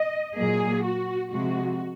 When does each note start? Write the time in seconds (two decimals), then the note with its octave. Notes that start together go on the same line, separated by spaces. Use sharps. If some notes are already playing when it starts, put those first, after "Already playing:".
Already playing: D#5
0.36 A#2 F#3 A#3 G#4
0.83 F#4
1.30 C3 F3 G#3 F#4